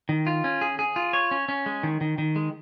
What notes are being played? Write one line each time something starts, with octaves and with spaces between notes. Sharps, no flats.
D#3
F4
C#4
G#4
G#4
F4
C#5
C#4
C#4
G#3
D#3
D#3
D#3
G#3